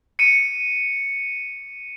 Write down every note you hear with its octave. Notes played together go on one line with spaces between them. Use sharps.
C#7 D#7